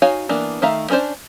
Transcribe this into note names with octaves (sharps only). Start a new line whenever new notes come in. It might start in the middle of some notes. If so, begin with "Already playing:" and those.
D#4 F#4 C#5 F5 G#5
E3 A#3 B3 D4
D#3 A3 E5 F5 A#5
B3 C#4 D4 C5 D5